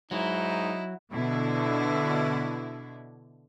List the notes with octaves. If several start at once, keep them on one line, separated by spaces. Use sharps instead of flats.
G#2 F#3 D#4 E4
B2 D3 E4